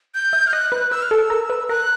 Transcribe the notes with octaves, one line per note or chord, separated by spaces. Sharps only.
G6
E5
F6
D#5 F#6
B4
B4 E6
F6
A4 E6
A#4
B4
A#4 F#6